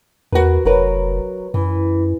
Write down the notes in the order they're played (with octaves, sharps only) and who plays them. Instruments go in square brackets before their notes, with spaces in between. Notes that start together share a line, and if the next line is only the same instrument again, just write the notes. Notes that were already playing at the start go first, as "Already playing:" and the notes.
[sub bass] E2 [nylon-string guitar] F#4 A#4 B4
[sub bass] F1 [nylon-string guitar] F#3 A#4 B4
[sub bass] F#2 [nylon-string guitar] E3